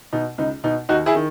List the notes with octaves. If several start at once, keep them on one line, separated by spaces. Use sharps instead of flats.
B2 D#4
C#2 D#4
B2 D#4
D#2 D#4 F#4
E4 G#4
D#3